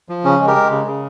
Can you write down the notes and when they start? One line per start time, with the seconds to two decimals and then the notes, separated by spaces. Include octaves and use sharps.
0.09 F3
0.24 C#3 C#4
0.39 G#3
0.47 G4 A#4
0.56 G#3
0.71 C#3
0.87 C#3